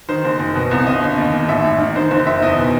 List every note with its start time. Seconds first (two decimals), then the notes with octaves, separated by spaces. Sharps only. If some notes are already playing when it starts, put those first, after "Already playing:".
0.09 D#3 C5
0.25 F#1
0.40 F#1
0.55 B2
0.71 C2
0.87 G1 D#5
1.02 G1
1.18 D#2
1.33 D#3
1.49 A1 E5
1.64 A1
1.80 D#3
1.96 D#3 C5
2.11 F#1 C5
2.27 D#3 E5
2.42 E2 D#5
2.58 B2